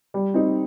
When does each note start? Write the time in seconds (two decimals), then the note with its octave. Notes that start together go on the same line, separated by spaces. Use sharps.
0.14 G3
0.34 C4 D#4